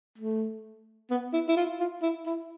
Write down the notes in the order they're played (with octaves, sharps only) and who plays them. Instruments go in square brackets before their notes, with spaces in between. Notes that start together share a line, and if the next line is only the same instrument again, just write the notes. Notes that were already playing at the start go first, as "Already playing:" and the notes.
[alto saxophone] A3
B3
E4
E4
F4
F4
E4
E4